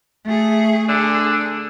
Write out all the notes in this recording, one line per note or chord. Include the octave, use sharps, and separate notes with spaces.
A3 G#4
D3 G#4